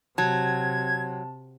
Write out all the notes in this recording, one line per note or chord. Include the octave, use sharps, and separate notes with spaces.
C3 F#3 A5 G#6